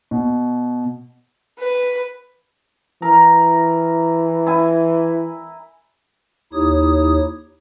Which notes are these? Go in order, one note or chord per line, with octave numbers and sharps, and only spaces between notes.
B2
B4
E3 A#4
E4 G#5
D#2 D#4 E4 G4 C#5 D#6